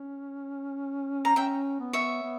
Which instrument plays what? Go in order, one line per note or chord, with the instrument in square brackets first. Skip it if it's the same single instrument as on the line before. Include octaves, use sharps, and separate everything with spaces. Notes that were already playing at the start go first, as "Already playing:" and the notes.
Already playing: [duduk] C#4
[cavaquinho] A#5
[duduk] C#4 [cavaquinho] E5 G5
[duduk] B3
[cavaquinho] C#5 E5
[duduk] B3